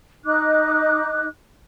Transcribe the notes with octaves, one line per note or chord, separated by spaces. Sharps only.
D#4 D6 F#6